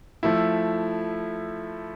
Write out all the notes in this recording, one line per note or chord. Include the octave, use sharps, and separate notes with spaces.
F3 A3 E4